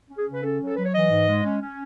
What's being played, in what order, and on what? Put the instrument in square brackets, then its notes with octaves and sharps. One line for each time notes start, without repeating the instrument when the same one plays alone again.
[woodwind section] C#4
G#4
C#3
B4
C#4 A4
F#3
A4
F#3 B4
C#5
E3 D#5
G#2
G#3
C#4
C#4